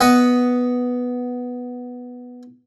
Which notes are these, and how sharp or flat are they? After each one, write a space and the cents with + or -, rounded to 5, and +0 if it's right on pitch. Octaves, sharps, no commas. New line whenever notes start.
B3 +0 D#5 +0 F#5 +5